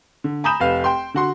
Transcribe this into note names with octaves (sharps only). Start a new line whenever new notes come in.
D3
G#5 A#5 B5 D#6 G6 E7
F1 B4 F5
G5 C6
D3 F#4 C6